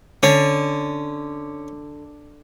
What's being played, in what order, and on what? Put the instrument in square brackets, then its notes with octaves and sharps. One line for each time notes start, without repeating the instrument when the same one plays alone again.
[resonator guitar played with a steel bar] D3 [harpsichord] C#4